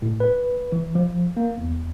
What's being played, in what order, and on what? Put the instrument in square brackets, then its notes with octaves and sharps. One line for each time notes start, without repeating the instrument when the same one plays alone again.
[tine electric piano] A2
B4
E3
F3
A#3
E2